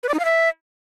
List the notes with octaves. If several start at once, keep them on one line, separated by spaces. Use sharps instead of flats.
B4
D5
D#4
F5
E5